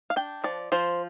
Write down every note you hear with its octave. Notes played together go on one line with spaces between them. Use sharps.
F5
D4 G5
F3 D5
F3 C5